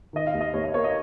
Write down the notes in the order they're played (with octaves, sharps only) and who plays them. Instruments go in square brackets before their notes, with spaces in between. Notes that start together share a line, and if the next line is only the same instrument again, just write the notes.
[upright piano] D#3 D#5
F5
D#2
D#5
D#2 C#5
D#5
A#3 C#5
D#5